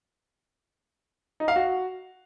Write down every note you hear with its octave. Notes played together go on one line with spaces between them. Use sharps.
D#4
F5
F#4